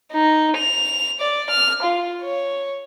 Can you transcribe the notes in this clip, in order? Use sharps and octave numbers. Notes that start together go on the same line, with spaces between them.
D#4
F7
D5
F6
F4
C#5